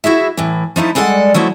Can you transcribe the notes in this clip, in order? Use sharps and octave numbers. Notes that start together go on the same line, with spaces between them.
E4 F#4 G#4 E5
A2 E3
F3 A3 D#4 E4
G3 G#3 A4 D5 F#5
F3 F#3 A3 E4